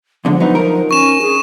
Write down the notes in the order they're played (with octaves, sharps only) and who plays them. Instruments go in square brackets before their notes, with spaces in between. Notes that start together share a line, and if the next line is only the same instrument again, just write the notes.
[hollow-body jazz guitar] E2 D3 G#3 [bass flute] F3
[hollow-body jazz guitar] F#3 B3 D#4
D#4 A#4
[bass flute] C#4 [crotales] C#6 E7
[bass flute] G#4